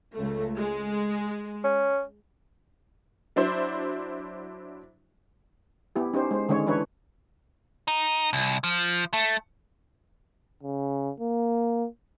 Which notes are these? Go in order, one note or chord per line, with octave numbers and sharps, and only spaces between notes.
C#2 A3
G#3
C#4
F#3 D4 E4 C5
B3 E4 G4
C#4 D#4 G4 C5
G#3 C5
D3 D#3 G#3 C#4 C#5
E3 D4 E4 B4 C#5
D#4
C2
F3
A3
C#3
A#3